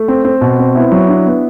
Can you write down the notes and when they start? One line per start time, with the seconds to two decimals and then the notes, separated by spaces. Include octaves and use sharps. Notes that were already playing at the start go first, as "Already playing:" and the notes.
Already playing: A3
0.08 C4
0.25 C4
0.41 B2
0.59 C4
0.75 B3 E4
0.92 F#3
1.08 D4
1.26 B3